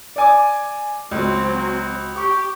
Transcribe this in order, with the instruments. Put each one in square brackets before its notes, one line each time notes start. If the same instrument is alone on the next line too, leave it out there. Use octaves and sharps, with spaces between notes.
[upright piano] D5 G#5 D6
[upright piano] C#2 [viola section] F#3 C4
[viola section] G4 [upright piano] C#6